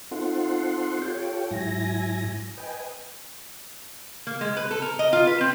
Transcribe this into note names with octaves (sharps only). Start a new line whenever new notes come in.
C4 D#4 F4 A4 F#5 C6
F4 G4 A4 C#5 G5
G#2 F#3 E4 G#5 A#6
B4 D#5 G5 G#5
A#3
G#3
B4
A4
A#4
D#5
F4
B4
C4